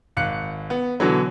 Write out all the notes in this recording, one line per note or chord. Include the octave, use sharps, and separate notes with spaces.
G#1 F5 F#6 C#7
B3
B2 D3 E3 F#3